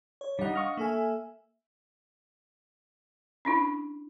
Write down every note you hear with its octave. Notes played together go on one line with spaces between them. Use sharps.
C#5
G3 D4 D#4 F#5
D#5 F5 C#6
A#3 A4 E5 G#5
C#4 D4 E4